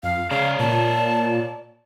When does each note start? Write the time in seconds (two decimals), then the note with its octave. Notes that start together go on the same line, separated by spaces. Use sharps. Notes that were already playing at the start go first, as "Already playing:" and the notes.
0.03 F2 F5
0.31 C#3 C#5 D5 F5 A#5
0.59 A#2 A5